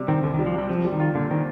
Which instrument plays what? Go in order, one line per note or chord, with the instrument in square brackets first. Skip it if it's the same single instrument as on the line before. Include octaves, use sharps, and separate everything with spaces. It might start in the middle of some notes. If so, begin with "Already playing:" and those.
Already playing: [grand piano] C3 G3
[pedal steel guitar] D#3 [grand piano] C4
[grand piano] C2 [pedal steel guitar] D3
[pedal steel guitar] D#3
[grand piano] G3
[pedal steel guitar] F3
[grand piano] C3 [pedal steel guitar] G3
[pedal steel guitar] F3 [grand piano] C4
[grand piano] G3
[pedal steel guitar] D#3
[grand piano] F4
[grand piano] A#2 [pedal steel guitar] D3
[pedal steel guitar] D#3 [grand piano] C4